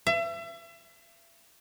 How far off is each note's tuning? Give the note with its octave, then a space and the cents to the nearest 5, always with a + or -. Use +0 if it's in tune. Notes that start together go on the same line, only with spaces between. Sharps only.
E5 +35